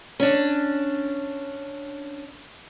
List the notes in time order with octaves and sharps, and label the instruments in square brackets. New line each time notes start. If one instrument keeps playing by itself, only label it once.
[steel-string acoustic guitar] C#4 D4